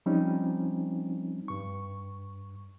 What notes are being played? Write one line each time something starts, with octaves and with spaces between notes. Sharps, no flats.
F3 G3 C4 C#4 D#4
G2 C#6